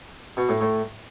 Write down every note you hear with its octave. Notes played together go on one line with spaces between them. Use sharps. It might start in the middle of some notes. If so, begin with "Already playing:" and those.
B2
A2
A2